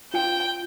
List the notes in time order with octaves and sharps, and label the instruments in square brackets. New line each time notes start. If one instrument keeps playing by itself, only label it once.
[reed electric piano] F4 [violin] G5